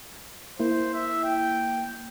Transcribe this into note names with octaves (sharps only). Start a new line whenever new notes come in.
A#3 E4 C5
E5
G5